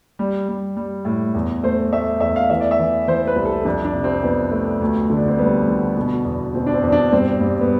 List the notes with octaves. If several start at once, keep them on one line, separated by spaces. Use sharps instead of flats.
G3
G3
G3
A2
E2
A3 C5
A3 E5
E2 E5
F5
E3 E5
D5
E5
E3
E3 C5
B4
C2
A4
F2 D4
D4
C3
C4
F2 B3
A3
D2
D3
D4
C4
G3 B3
D3
B2
E2
B2 C4
D4
C4
E2
D4
G2 C4
G2
B3